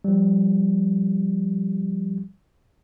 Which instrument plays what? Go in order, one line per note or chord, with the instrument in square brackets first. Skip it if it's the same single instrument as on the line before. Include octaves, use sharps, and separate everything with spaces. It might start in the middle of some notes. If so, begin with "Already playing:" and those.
[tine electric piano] F3 G3